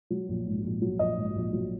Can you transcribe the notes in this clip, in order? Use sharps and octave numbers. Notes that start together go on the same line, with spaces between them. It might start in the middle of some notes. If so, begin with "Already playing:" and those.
F#3
A#1
G#2
A#1
F#3
A#1 D#5
G#2
A#1
F#3